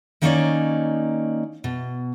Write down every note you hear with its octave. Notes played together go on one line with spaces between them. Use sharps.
D#3 A#3 C#4 D#4 C#5 D5
B2